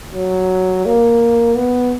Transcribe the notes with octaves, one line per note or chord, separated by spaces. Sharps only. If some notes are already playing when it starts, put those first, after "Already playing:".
F#3
A#3
B3